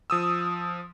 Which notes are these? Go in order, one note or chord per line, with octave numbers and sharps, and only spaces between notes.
F3 D#6 E6